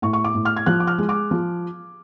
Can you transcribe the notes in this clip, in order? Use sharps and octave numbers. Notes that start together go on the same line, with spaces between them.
A2 C#6
C#6
D6
A2
F6
G#6
F3 F#6
D6
F6
G#3
D6
F3